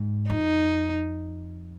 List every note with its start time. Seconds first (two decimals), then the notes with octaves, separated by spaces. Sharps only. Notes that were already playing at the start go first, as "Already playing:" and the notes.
Already playing: G#2
0.29 F2 D#4